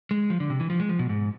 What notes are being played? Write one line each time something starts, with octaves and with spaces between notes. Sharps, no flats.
G#3
F3
D3
C3
E3
F3
G#3
F3
B2
G#2